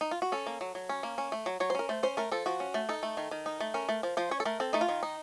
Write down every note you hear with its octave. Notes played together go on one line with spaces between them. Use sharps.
D#4
F4
F#4
C#4 A4
A#3
F#3
F#3
C#4
A#3
C#4
A3
F#3
F#3 C#5
C5
C#4 A#4
A3 C5
C#4 C5
A3 A#4
F3 A4
F3 F#4
C#4
A3
D#4 A4
A3
D#3
D#3
D#4
A3
C#4 A#4
A3
F3
F3 C5
C#4 C#5
A4
A3 A#4
C4 A4
A3 D#4
F4
D#3
D#4